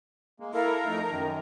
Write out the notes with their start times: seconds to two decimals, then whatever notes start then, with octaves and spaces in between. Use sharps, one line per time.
0.40 G#3 A#3
0.54 E4 A4 A#4 F5
0.85 F2 A3 D#4
1.10 F#2 D#3